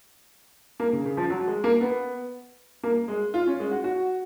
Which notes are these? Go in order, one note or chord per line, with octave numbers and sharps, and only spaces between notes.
A#3
C#3
C#3
F3
F#3
G#3
A#3
B3
A#3
G#3
F4
C#4
G#3
F#4
F#4